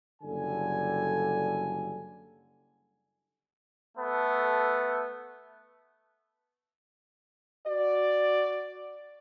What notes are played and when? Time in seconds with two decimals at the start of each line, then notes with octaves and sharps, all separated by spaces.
0.22 F#1 D3 G3 A4 G#5
3.98 A3 B3 A4
7.66 F#4 D5